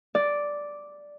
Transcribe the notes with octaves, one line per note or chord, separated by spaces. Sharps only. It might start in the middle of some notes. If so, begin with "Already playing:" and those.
D5